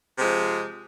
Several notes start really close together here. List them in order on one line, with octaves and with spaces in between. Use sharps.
C3 G#3 F3